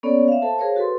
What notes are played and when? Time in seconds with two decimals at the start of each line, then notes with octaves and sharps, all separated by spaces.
0.03 A#3 B3 C#4 A4 C#5 D5
0.28 E5 F5
0.42 A4 C5 A5
0.58 G#4 A#4 C5 C#5 F5
0.76 F#4 A4 B4 C6